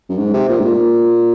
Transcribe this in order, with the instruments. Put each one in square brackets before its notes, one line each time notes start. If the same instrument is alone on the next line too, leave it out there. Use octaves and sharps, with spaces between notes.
[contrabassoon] F#2
G#2
C3
A#2
G#2
A#2